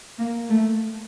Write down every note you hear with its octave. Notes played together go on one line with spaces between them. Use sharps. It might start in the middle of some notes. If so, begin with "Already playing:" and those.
A#3
A3